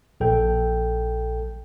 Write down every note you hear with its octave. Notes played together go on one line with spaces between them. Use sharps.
A#1 A4 G5